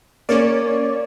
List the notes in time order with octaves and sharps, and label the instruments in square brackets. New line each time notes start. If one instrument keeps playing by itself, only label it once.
[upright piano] A#3 [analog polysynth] C#4 C#5 D5